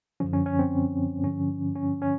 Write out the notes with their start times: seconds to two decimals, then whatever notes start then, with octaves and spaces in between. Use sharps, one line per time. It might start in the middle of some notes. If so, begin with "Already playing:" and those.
0.20 F#2 D3 F3 C#4
0.33 C#4
0.46 C#4
0.59 C4
1.23 G2 D3 F3 C#4
1.76 C#4
2.02 C#4